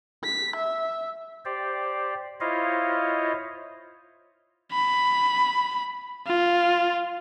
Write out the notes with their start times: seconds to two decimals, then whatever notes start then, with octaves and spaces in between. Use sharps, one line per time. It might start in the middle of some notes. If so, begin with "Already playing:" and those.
0.24 B6
0.56 E5
1.45 G4 C5 D5
2.40 E4 F4 C5 C#5 D#5 F5
4.72 B5
6.27 F4